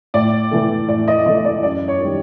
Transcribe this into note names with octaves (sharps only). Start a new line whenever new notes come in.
A2 D5
E3 A3
A2 D5
D#5
E3 A3 D#5
D#5
D5
F#2 D5
C#5
D#3 G3